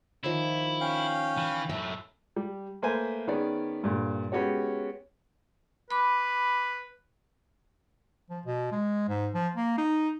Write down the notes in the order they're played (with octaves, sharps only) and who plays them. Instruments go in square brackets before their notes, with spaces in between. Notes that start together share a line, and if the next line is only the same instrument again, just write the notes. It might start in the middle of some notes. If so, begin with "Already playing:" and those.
[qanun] D#3 F3 C#5 [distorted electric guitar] E4
[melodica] C#4 F5 G5
[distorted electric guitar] E3
[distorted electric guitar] F#2 A2 [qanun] E5
[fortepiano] G3
A3 A#3 B4 C5 E5 G#5
D#3 B3 C#4 G#4 D5
G2 A#2 D3
G#3 B3 C#4 F#4 G4 C#5
[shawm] B4 [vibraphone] B5 D6
[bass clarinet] F3
B2
G#3
G#2
F3
A#3
D#4